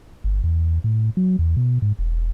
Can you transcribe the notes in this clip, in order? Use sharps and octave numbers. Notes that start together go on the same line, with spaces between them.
G1
E2
A2
F#3
E2
B2
G#2
E1